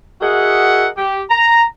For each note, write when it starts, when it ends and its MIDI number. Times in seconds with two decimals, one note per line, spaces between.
0.22 0.87 66
0.22 0.87 68
0.22 0.87 70
0.22 0.87 75
0.22 0.87 76
0.22 0.87 78
0.97 1.23 67
1.30 1.64 82